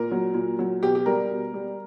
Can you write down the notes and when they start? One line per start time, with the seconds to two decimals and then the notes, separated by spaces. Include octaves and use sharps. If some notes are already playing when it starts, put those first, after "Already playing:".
Already playing: A#2 A#4
0.11 F#3
0.34 A#2
0.59 F#3
0.83 B2 G4
0.95 G4
1.06 G3 A#4
1.31 B2
1.54 G3